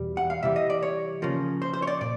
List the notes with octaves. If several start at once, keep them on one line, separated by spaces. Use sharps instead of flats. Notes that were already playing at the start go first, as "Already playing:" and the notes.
Already playing: E2 B2 G3
F#5
F5
C3 E3 G3 E5
D#5
D5
C#5
C#3 F3 A#3
C5
C5
C#5
D5
A#2 D5